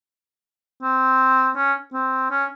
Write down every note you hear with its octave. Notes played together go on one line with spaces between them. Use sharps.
C4
C#4
C4
C#4